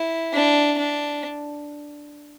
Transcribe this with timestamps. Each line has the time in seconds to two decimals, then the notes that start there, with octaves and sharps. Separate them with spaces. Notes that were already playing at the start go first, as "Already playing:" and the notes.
Already playing: E4
0.34 D4
0.78 D4